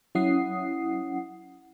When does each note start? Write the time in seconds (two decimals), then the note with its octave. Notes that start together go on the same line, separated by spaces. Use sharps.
0.15 F#3 C#4 E4 F#5 D#6 C7